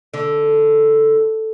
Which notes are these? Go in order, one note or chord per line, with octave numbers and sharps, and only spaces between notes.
D3